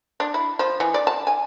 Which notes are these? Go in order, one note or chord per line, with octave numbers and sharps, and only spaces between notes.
D4
E4
F3
E3
D5
A5
G#5